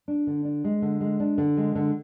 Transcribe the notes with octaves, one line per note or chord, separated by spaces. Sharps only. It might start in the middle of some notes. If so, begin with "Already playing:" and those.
D4
D3
D4
G#3
D3
G#3
D4
D3
G#3
D3